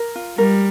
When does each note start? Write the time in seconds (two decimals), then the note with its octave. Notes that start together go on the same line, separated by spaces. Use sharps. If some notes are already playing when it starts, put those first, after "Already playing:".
Already playing: A#4
0.16 F4
0.38 G3 A#4